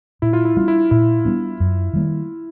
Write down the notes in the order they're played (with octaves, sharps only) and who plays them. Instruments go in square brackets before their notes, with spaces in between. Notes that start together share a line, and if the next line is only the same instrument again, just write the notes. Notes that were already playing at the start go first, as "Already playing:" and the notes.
[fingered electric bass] A#2 [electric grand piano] E4
[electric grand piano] F4
E4
[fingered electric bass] G3 B3 D4 [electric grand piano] F4
[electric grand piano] E4
[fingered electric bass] A#2 [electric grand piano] E4
[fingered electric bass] G3 B3 D4
F#2
D#3 G3 A#3